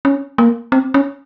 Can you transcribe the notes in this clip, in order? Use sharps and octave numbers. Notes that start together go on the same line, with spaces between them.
C#4
A#3
C4
C#4